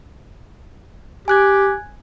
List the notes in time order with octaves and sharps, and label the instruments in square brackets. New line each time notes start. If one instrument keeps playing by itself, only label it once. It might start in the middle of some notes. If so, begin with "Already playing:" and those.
[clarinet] G4 [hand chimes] G#5 F#6 G#6